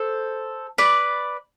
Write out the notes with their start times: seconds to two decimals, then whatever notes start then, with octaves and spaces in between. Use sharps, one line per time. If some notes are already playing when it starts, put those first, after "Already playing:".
Already playing: A4 C5
0.78 B4 D5